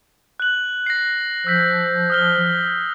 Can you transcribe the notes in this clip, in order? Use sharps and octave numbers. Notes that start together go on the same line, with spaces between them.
F#6 F#7
A#6 C7
F3 E6 G6 B6
D#6 F6 G7